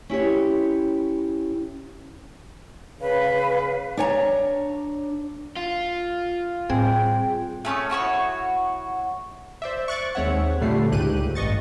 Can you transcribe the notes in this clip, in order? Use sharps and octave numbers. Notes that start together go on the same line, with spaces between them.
C#4 E4 G4 C#5
C#3 B4 F5
D4 C#5 G#5 A#5
F4
A2 G3 C4 G#4 G5
A3 C#4 C#6 D#6
E4 F#4 C#5 C#6
C5 D5 E5
C#6 F#6 A6 D7
D#2 G#3 C4 C#5 E5 F#5
A#1 D3 G3 A3 C7
C#2 G#2 G4 F#6 D#7
A1 G2 D#5 C#6 A6